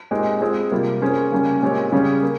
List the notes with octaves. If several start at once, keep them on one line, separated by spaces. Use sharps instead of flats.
A#2 G#3 C4 D#4 G4
G#3 C4 F4 G#4
C3 G3 A#3 F4
A#3 C#4 G#4 C5
C#3 G3 A#3 C#4
A#2 G#3 C4 G4 C#5
C#3 G3 C#4 G#4 C#5
A#3